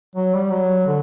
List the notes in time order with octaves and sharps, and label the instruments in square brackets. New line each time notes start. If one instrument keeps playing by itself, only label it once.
[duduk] F#3
G3
F#3
D3